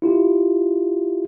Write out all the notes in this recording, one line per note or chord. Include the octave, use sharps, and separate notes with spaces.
E4 F4 G4